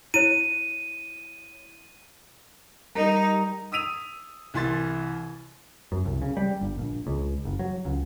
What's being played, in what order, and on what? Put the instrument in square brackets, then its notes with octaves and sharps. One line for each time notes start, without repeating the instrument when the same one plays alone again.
[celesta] E4 C#5 [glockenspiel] D#7
[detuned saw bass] G3 [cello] D#4 [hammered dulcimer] A#4
[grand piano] D#6 E6 B6 D#7 F7
C2 E3 C6 A6
[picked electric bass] F#2
C2
C#3
G3
G1
A#1
C#2
F#1
F#3
C#2